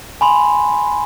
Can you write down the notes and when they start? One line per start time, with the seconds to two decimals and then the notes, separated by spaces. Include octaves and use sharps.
0.21 G#5 B5 C6